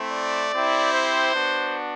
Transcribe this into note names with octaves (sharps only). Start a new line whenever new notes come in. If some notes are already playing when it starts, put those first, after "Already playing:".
Already playing: A3 C4 E4
D5
C4 E4 G4
C5
B3 D4 F#4